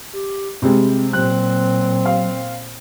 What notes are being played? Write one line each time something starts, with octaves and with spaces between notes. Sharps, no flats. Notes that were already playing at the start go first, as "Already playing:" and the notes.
G4
C3 G3 G#3 C4
A#2 F#3 C4 F#6
F5